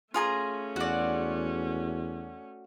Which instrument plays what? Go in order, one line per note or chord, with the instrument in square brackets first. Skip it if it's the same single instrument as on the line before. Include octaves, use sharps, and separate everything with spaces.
[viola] A3 C#4 [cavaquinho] F4 G#4 A#5
[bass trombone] E2 [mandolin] F#4 D5